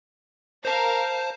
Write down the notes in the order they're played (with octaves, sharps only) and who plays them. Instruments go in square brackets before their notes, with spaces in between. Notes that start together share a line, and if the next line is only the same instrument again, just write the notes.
[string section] A#4 F5 A#5 [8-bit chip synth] C5 A5